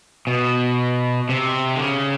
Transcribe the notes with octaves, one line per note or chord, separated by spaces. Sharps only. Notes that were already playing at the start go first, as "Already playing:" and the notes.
B2
C3
D3
C#3